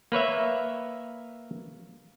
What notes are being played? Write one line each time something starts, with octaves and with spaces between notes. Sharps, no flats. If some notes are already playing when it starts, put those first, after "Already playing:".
A#3 B4 C#5 E5